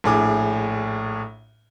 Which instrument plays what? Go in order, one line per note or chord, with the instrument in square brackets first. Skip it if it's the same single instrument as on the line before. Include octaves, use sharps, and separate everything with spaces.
[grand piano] A#1 A2 G#4 D6